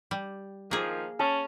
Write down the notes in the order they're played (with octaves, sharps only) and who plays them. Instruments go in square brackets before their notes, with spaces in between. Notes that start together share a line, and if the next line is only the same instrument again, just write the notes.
[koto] G3
[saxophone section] D#3 F3 [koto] A#3 G#4
[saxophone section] C#4 [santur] A5